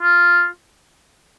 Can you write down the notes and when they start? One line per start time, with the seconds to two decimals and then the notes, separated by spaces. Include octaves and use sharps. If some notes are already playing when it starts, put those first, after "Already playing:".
0.01 F4